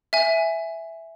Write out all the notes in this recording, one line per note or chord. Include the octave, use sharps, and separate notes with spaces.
E5 G#5